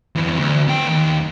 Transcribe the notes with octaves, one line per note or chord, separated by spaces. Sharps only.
F2 E3
D2
B3 G5
D#2